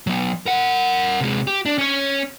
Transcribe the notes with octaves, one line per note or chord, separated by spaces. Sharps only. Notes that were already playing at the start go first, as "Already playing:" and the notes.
F#3 B3
A#4 F#5
C3 G#3
G4
D4
C#4 C#5